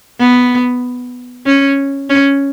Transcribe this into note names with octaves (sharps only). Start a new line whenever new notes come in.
B3
C#4
C#4